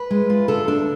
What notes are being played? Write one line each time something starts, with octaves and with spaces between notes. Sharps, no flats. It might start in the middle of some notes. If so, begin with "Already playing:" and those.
Already playing: B4
G#3
F4
D3 A4
D4 A4